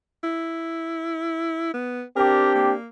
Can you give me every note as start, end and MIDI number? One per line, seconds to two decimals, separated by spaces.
0.24 1.70 64
1.74 2.03 59
2.17 2.73 60
2.17 2.73 62
2.17 2.73 67
2.17 2.52 70
2.55 2.87 58